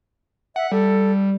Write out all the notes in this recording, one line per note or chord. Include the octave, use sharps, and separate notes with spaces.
E5 F#5
G3 A4